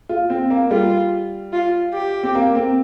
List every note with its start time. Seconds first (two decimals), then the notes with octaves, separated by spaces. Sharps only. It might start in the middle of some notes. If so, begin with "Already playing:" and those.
0.09 F4
0.30 C4
0.50 A#3
0.71 G3 F4
1.53 F4
1.94 G4
2.23 C4
2.35 A#3
2.55 C4